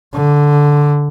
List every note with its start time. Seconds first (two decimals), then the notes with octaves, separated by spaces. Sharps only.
0.13 D3